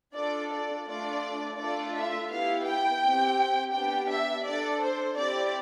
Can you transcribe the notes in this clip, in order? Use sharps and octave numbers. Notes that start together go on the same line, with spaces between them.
D4 F4 A4 D5
D5
A3 D4 F4 D5
A3 D4 F4 A4 D5
E5
B3 E4 G4 F5
G5
C4 G4
B3 D4 G4 G5
E5
D4 A4 D5
C5
C4 E4 G4 D5